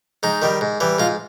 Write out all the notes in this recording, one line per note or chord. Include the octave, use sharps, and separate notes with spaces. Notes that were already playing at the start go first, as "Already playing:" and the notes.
G#2 D#4
D#3 G3
G#2
E3 G3
G#2 F4